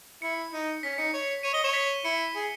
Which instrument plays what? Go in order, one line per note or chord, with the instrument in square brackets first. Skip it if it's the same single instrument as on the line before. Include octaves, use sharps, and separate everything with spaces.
[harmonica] E4 [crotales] C#7
[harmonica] D#4
[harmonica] C#4 [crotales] B6
[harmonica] D#4 [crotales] C#7
[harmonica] C#5
[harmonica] C#5 [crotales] D#7
[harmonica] D#5 [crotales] G7
[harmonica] C#5 [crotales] E7
[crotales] B6
[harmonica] E4 [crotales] C#7
[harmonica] G#4